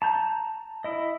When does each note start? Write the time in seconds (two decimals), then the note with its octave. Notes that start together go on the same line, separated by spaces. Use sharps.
0.02 A5 A#5 G6
0.84 E4 D#5